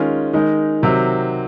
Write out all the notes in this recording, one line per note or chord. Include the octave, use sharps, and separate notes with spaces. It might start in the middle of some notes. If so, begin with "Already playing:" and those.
Already playing: D#3 G#3 C#4 F4 G#4
D#3 G#3 D#4
C3 D#3 F#3 C4